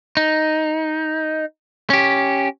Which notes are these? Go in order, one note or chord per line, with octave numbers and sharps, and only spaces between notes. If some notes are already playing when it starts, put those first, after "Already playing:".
D#4
C#4 G4